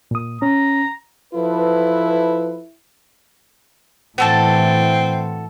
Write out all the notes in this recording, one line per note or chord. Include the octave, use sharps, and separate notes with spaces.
A#2 D#6
C#4 A#5
F3 E4 A4 B4
A2 E3 C4 F#4 A4 A5